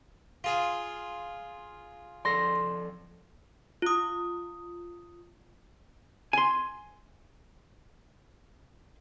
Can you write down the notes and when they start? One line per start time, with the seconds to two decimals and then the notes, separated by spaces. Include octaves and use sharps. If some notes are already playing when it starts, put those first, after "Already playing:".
0.44 F4 G#4
2.25 F3 A4 D5 C6 A#6
3.82 F4 D#6
6.33 G#5 C6